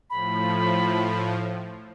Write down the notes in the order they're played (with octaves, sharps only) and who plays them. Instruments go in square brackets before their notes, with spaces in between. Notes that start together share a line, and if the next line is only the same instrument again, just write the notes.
[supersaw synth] A2 F3 [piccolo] B5